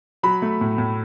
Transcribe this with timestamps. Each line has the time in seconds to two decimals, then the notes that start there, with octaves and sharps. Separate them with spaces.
0.23 F#3 B5
0.42 A3
0.61 A2
0.78 A2